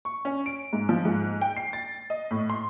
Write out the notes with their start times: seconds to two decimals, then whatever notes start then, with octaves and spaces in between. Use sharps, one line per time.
0.05 C#6
0.25 C#4
0.46 D7
0.73 G#2
0.89 F3
1.05 G#2
1.41 G5
1.57 C7
1.73 A6
2.10 D#5
2.31 A2
2.50 C6